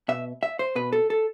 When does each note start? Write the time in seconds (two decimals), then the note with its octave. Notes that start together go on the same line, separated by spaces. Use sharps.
0.08 B2 E5
0.43 E5
0.59 C5
0.75 B2 B4
0.93 A4
1.10 A4